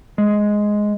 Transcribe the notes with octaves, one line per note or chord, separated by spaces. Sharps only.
G#3